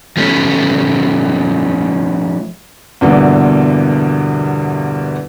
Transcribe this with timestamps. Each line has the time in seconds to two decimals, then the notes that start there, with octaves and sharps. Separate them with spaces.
0.17 F3 A3 C#4
3.01 E2 G2 B2 D3 E3 A#3